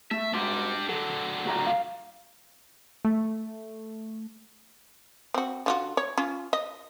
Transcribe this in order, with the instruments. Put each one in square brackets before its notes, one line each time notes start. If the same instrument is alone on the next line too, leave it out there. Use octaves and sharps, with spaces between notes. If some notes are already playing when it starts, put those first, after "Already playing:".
[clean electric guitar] A3 [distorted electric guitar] E5
[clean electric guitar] G#2 F#4 C6 [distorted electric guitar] G3 D4
[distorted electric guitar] D3 F#3 [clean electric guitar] A4
[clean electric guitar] A2 F#4 A#5
F5
[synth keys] A3
[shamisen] C4 F#4
D3 F4 F#4
C#5
C#4 F4
D#5